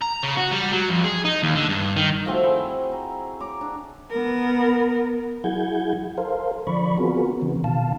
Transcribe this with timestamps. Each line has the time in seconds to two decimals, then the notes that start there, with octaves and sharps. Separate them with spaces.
0.01 A#5
0.23 C#3
0.37 F#4
0.52 G3
0.72 F#3
0.90 F2
1.04 G#4
1.24 D#4
1.43 D#2
1.55 D3
1.69 G2
1.96 D#3
2.25 F3 A3 C4 F#4
2.43 E4 G#4
2.92 A#5
3.40 C#5 A#5 D6
3.61 D4
4.10 B3 A#4
5.44 F#3 E4 G#4 F#5 G6 G#6
6.18 A4 A#4 C5 F5
6.67 D3 F3 D5 B5 C#6
6.98 B3 C4 F4 F#4 G#4 A#4
7.42 C#3 E3 B3
7.64 B2 D#3 F5 A5